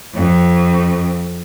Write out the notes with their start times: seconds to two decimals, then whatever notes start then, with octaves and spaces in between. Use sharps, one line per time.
0.14 F2